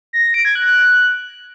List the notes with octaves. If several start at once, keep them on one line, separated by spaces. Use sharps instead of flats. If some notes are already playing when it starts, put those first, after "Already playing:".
A#6
A#6
D7
G#6
F#6